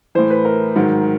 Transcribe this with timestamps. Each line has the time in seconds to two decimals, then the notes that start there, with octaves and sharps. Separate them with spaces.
0.15 A2 E3 C5
0.30 B4
0.45 A#4
0.76 G#2 D#3 F#3